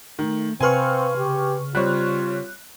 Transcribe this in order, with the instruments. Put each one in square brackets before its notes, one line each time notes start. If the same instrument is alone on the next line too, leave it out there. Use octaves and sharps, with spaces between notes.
[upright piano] D#3 [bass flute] A3
[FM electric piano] C3 B4 C#6 [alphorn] C4 [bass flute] F5 [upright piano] G#5 C6 F6
[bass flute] C#3 [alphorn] G4
[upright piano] G3 C4 C#5 [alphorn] F4 [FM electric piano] F#6